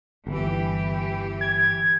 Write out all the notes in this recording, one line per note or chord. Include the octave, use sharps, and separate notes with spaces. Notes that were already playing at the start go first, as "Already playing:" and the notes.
G1 E3 G4
G#6